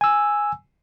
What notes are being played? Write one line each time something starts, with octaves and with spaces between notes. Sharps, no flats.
G#5 E6